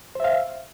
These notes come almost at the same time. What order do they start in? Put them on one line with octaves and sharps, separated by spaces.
C5 E5 F5